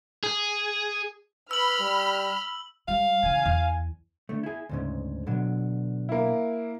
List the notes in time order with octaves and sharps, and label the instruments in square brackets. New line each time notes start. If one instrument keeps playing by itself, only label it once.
[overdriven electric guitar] G#4
[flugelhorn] B4 [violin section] B5 F6 [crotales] E6 F#7
[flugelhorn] G3
[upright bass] G3 [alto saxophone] F5
[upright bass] C#3 E3 [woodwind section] G#5
[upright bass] E2
[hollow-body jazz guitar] D3 A3
E4 G#4
D2 G#2 C#3
B2 D3 F#3
[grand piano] A#3 E4